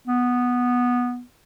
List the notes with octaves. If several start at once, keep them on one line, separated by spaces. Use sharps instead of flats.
B3